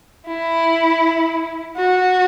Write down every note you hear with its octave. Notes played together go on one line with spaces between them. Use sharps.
E4
F#4